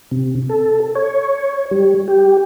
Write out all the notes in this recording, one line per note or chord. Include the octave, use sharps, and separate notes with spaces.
C3
A4
C#5
G3
G4